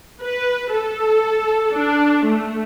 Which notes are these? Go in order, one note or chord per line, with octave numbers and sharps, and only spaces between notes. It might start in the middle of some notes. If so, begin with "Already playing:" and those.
B4
A4
D4
A3